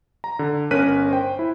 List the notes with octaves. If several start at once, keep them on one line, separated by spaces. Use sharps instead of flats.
A#5
D3
G1 C#4 A#4 F#6 B6 D#7
C5 G5
E4